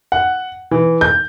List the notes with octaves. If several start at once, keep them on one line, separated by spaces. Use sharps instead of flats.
F#5
E3
G6